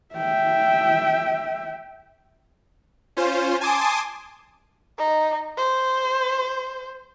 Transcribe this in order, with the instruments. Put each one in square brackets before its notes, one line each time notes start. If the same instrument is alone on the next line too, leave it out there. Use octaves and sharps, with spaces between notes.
[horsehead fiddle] E5 G5
[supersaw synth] C#4 F4 C5
G#5 A5 C6 D6 D#6
[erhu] D#4
C5